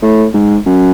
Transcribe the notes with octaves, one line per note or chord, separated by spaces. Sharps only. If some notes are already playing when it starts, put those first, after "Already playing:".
A2
G#2
F#2